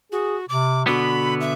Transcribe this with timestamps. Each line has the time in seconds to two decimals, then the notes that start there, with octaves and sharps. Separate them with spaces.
0.12 F#4 G#4
0.49 C3 D6
0.87 B2 D3 B3 F#4 B5
1.40 E5